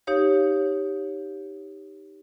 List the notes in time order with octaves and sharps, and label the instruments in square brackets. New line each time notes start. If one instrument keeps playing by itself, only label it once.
[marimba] D#4 G4 C#5 F5